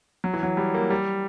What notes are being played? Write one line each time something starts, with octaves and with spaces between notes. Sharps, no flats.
F#3
E3
F#3
G3
A#3
G3